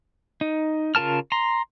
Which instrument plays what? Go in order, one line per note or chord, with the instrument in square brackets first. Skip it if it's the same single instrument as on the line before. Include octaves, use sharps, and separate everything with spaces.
[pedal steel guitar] D#4
C#3 F4 A#4 A5 F6
A#5 C6